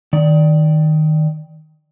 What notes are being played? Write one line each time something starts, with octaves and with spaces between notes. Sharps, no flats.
D#3 D5